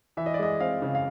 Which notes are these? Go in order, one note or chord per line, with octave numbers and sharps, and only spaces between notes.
E3 E5
D#5
D5
G#3 D#5
C4 F5
C#3
F5